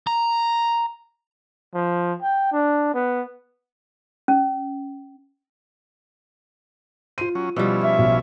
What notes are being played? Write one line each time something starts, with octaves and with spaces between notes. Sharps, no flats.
A#5
F3
G5
D4
B3
C#4
F4 C5 D#7
F#3 C#4
B2 F3 G3 C#4 E4
E5
B1